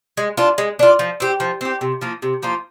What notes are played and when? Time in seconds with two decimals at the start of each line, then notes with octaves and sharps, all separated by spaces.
0.17 G#3
0.37 D4 F4
0.58 G#3
0.79 D4 F4
0.99 F3
1.20 C4 G4
1.40 F3
1.61 C4 G4
1.81 C3
2.01 F3 A#3 F4
2.22 C3
2.43 F3 A#3 F4